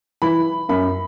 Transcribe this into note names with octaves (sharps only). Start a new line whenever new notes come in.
E3 B5
F#2 B5